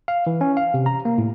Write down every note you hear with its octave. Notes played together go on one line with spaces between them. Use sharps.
F5
E3
C#4
F5
C3
A#5
A#3
A2